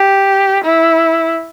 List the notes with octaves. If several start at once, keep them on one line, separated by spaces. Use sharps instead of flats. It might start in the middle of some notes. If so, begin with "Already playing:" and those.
Already playing: G4
E4